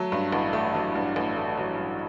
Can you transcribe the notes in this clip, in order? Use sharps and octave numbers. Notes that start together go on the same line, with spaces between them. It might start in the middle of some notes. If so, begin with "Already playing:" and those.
Already playing: F#3 A3
G2
A1
A3
F#3
G2
A1
A3
F#3
G2